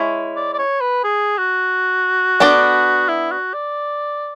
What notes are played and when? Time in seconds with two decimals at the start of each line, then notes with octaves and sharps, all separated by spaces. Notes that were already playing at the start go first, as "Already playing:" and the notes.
Already playing: G#3 C#4 E4
0.36 D5
0.54 D5
0.59 C#5
0.81 B4
1.04 G#4
1.38 F#4
2.40 B3 D4 A4 D5
3.09 E4
3.31 F#4
3.54 D5